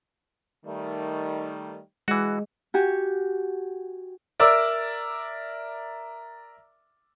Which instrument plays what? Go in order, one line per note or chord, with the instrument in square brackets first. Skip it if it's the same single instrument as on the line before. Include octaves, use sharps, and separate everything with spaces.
[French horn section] D#3 G3 A3
[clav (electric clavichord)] E3 F#4 [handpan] G#3
[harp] F#4 G4 G#5
[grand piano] A#4 D5 E5 D6 E6